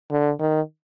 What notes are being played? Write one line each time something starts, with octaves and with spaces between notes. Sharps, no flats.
D3
D#3